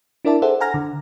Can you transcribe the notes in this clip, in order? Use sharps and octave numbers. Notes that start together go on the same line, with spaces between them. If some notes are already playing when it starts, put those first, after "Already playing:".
D4 E4 A#4 D5 E5 A5
G#4 A4 C5 E5 F#5
F#5 G#5 A#5 F6 A#6
D3